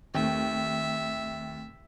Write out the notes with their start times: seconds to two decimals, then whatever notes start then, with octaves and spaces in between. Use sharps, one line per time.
0.15 D#2 A3 C4 E5